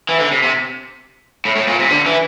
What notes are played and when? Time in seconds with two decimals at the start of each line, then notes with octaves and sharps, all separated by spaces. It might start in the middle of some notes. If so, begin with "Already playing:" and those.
0.09 E3
0.20 D3
0.31 C3
0.43 C3
1.45 A2
1.56 A2
1.68 A#2
1.80 C3
1.90 D3
2.06 E3